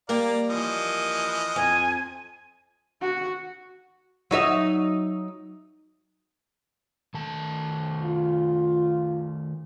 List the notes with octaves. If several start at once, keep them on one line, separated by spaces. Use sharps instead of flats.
G3 A#3 A#4 D5 F5 A#5
E3 F3 D#5
F2 G#5
F#4
F#3 D#4 E5
D#3 A3 A5
F4